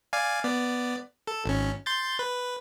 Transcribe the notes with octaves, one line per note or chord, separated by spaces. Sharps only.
D5 F5 G#5
B3 D5
A4
G#1 C#4
C6 G6 A6
B4